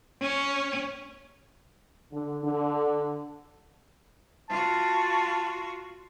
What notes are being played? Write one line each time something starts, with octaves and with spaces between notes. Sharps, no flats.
C#4
D3
D3
F4 F#4 A5